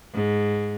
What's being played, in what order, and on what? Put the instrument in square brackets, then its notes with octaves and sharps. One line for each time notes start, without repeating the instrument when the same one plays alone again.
[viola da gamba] G#2